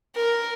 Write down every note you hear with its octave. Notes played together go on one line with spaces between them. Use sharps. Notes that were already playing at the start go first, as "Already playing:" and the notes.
A#4